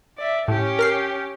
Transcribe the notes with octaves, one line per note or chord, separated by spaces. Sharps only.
D5 E5
A2 C#4 G4
A#4 F6 C7